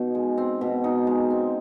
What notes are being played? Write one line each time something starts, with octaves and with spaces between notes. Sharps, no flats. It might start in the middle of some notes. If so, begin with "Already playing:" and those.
Already playing: B2 D#4
G#3
C4
B2
D#4
G#3
C4